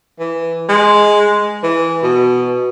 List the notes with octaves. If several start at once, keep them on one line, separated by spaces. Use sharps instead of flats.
E3
G#3
E3
B2